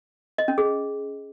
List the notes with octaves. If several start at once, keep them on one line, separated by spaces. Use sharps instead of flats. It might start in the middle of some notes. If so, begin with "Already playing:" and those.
D#5
C#4
G#4